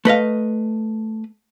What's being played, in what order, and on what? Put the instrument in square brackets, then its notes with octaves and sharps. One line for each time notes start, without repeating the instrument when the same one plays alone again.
[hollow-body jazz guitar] A3 B4 D#5 F5